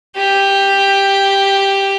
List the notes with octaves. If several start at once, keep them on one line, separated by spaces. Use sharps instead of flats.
G4